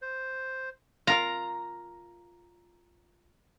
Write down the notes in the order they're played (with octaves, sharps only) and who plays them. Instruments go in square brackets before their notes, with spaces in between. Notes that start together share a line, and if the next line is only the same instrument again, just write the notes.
[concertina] C5
[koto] F4 A#4 F5 [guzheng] A#5